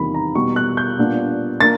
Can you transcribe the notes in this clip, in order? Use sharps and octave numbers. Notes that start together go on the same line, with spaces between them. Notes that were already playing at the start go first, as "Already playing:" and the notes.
Already playing: E2 C3 D#3 G3 A#3 B5
A#5
B2 G3 B3 C#6
F#6
G6
A#2 G3 B3 D4
A#3 D4 A6